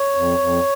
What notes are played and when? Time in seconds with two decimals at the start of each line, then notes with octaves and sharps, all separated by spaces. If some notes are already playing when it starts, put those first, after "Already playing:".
Already playing: C#5
0.15 F2
0.38 F2